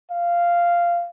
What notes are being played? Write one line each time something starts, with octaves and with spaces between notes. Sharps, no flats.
F5